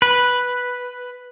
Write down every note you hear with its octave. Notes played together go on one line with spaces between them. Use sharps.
B4